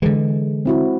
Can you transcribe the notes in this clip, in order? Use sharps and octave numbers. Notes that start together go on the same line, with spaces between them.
D3 E3 G#3
C4 E4 F#4